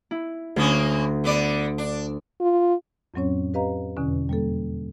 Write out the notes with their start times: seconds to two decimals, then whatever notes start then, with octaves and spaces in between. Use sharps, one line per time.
0.11 E4
0.56 D2 A2 A#3 C#4 D#6
1.24 D3 B3 D5
1.78 D4
2.41 F4
3.14 F2 A2 F#3 C4 C#4 C#5
3.54 G4 B4 D#5 F5 A#5
3.97 E2 B2 D3 C#4
4.29 G3 A#3 A4